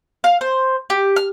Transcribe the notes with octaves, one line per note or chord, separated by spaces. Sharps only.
F5
C5
G4
F6